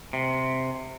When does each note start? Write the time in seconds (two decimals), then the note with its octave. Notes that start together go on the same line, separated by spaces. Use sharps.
0.13 C3